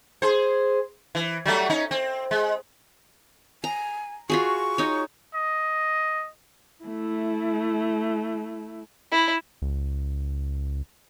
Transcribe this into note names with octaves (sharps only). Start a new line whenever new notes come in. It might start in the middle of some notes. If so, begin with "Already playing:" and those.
G#4 C5
E3
F#3 G3 A3
C#4 D#4
C4
G#3
G#5 A#5
F4 F#4 G#4 C#6
D#4 C#5
D#5
A3 E4
E4
C#2